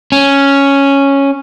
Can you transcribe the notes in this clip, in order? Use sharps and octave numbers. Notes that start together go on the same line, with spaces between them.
C#4